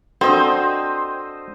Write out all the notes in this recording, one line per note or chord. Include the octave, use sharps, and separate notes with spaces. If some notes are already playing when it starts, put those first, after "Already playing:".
C4 D4 F#4 A4 C5 D#5 E6